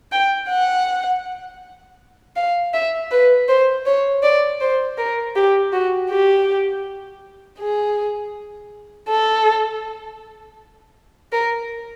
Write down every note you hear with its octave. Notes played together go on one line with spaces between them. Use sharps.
G5
F#5
F5
E5
B4
C5
C#5
D5
C5
A#4
G4
F#4
G4
G#4
A4
A#4